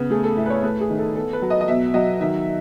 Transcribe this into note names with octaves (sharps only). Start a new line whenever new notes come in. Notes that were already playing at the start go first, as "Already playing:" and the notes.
Already playing: C#3 B3
A3 G#4
A4
A2 E5
B4
C#5
A3 B4
G#4
D#3
A4
B3 A4
B4
F#3
D#5
D#5
B2 E5
F#3 D#5
D#3 E5